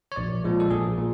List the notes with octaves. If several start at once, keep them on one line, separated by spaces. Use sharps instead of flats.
C#5
A#1 D5
A#2 F3 G#3
A4
A#1 G#4
A#2